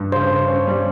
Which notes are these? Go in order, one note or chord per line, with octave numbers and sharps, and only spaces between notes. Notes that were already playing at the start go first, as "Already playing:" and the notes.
Already playing: G2
C#3 C5
C#3
C#4
G3